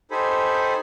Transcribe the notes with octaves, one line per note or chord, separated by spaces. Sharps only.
D#4 G4 A4 C5 G#5 B5